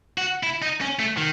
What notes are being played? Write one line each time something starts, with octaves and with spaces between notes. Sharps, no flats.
F#4
E4
D#4
C#4
A3
D#3